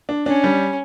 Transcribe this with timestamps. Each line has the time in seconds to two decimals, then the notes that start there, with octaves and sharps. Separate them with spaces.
0.09 D4
0.26 C#4 D4
0.44 G3